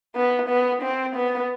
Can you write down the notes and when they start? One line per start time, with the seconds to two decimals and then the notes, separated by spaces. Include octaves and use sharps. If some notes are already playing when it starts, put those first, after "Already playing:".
0.16 B3
0.49 B3
0.83 C4
1.16 B3